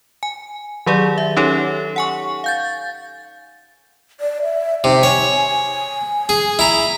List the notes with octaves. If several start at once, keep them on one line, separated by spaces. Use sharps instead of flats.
G#5
D#3 F#3 G4 G#4 D5
E5
C#4 D#4 G4 A4 C#5
F#5 G#5 C#6
F5 G6 A6
D5
E5
C3 D#4
C#5 G#5
G#4
E4 A#5